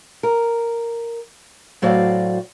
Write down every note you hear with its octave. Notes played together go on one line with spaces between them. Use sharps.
A#4
A2 F#3 F#4 C5 D5 F5